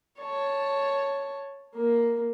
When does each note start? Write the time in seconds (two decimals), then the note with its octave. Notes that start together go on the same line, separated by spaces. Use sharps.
0.20 C#5 A5
1.75 A#3